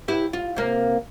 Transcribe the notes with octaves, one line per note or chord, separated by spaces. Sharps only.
E4 G4 B4
F4
C3 A#3